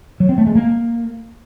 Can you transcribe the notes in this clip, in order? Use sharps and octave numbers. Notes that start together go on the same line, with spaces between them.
F#3
C4
A3
G#3
A#3